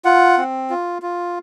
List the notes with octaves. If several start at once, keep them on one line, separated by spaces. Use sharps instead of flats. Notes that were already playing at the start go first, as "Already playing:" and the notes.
F4 F#5
C4
F4
F4